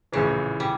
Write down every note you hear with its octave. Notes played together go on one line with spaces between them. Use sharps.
A#1 A2 C#3 E3
G3